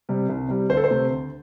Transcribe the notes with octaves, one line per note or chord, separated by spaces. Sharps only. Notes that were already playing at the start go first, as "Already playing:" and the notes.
C3 G3
C2
C3 G3
D2 C5
A4
C5
C3 A3
D2